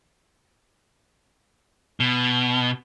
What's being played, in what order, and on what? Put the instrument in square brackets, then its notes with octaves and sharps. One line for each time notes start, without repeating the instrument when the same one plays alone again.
[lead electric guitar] B2